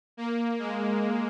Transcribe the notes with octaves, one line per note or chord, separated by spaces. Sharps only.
A#3
G#3